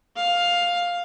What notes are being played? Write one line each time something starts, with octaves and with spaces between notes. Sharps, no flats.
F5